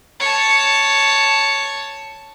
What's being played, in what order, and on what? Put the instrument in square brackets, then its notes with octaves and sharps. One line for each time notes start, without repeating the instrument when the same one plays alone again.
[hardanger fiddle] C#5 A5